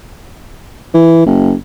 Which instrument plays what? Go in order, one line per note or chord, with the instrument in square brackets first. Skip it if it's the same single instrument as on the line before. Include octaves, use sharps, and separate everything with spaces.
[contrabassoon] E3
F#1